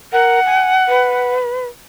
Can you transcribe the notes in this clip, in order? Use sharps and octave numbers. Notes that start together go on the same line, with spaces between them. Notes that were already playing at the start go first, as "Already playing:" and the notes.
A#4 F#5
G#5
B4